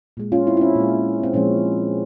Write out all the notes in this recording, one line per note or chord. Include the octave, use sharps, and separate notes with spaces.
A#2 G#3
C#4 F4
C4 E4
E4
C#4
A#2 G#3
C4
A#2 F3 G#3 C#4